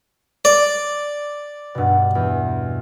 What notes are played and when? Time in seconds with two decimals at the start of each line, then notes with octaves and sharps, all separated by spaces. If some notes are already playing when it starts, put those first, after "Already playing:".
0.45 D5
1.75 G2 B2
2.15 E2